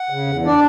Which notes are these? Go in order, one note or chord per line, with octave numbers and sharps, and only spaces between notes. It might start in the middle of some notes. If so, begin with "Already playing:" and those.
Already playing: F#5
C#3
E2
D4 D5